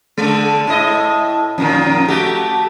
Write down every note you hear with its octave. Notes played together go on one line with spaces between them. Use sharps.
D3 G#3
A2 E4 D#5
F2 A#2 D#3
A3 F#4 G4